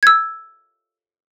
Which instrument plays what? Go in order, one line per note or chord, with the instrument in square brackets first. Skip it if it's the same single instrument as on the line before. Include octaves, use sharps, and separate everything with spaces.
[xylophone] E6 G#6